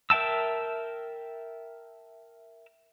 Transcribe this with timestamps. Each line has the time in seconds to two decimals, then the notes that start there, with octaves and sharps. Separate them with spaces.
0.10 A#4 E5 G5 A5 E6